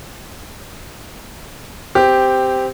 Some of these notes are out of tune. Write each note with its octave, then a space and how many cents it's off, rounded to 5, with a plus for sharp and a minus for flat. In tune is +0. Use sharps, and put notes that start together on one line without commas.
C4 -15 G4 +0